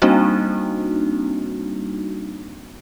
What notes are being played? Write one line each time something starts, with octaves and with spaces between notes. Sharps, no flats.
G3 A#3 C4 D4 D#4 F#4